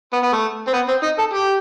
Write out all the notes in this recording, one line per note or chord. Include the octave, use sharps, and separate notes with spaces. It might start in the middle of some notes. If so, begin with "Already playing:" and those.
B3
B3
A3
C4
B3
C4
D#4
A4
G4